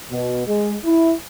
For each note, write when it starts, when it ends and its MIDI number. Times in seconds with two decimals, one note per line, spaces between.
0.11 0.43 47
0.46 0.74 56
0.85 1.13 64